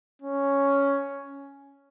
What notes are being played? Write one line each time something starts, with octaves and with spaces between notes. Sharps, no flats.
C#4